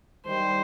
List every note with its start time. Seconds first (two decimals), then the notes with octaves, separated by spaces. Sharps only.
0.26 D#3 G3 C5